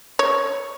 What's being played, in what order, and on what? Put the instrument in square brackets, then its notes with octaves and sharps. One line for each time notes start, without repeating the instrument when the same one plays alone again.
[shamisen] C#5